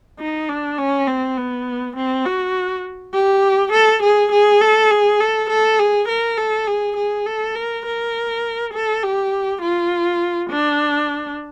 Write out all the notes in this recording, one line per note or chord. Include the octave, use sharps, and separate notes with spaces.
D#4
D4
C#4
C4
B3
C4
F#4
G4
A4
G#4
G#4
A4
G#4
A4
A4
G#4
A#4
A4
G#4
G#4
A4
A#4
A#4
A4
G4
F4
D4